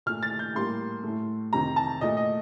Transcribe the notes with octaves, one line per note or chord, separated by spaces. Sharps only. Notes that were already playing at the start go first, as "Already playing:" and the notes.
A#2 A3 F6
A6
G6
A2 G3 A#3 C6
A2 A3
F2 C3 D#3 A#5
A5
A#2 A3 D#5
D#5